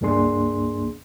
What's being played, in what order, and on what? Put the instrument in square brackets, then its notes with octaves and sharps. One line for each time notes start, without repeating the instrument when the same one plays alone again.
[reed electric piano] C#2 G2 A#3 D4 G#4 C6